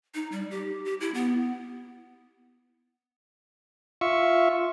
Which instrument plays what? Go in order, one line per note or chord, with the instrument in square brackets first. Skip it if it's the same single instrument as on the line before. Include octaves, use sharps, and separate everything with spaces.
[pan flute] D#4
G3
G4
G4
E4
B3
[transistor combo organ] F4 E5 C#6